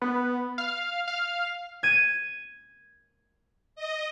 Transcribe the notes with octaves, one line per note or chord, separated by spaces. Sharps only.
B3
F5
F5
G#6 D#7
D#5